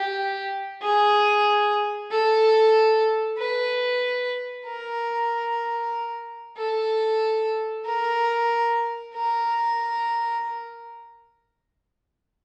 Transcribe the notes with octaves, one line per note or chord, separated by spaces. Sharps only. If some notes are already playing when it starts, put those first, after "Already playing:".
Already playing: G4
G#4
A4
B4
A#4
A4
A#4
A#4